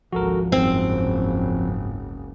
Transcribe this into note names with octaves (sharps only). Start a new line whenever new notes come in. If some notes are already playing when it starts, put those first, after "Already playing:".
G#1 C#2 F3 F#4 A4 A#4
F#1 C#2 G#2 C4